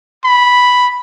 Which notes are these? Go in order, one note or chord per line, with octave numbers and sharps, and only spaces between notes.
B5